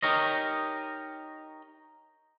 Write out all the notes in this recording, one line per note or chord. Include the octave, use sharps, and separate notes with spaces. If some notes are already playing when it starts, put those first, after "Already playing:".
D#4 G4 A#4 C#5 D#5